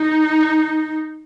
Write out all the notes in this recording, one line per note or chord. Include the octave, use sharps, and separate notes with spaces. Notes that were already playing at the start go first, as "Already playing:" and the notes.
Already playing: D#4